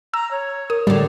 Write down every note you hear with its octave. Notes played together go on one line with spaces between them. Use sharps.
A#5 E6
C#5
A#4 D#6
A2 D3 G3